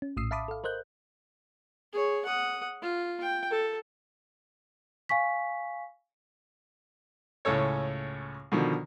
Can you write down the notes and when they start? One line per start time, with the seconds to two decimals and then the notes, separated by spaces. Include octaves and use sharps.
0.02 C#4
0.17 A#1 A2 D#6 E6 C7
0.31 E5 F5 A5 B5 D6 D#6
0.48 A4 F5
0.64 A#4 C5 D#5 F#6 G6
1.93 G#4 C#5
2.25 F#5 D#6
2.82 F4
3.21 G5
3.50 A4
5.09 F5 G#5 C#6 B6
7.45 C#2 A2 C#4 A4 C#5
8.52 B2 D3 D#3 F3